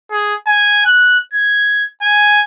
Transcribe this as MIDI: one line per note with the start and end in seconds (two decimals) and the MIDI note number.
0.11 0.34 68
0.47 0.82 80
0.86 1.18 90
1.33 1.86 92
2.02 2.43 80